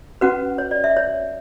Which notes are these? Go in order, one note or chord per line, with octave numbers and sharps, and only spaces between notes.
C#4 F#4 B4 F#5
C#5
D5
E5
C#5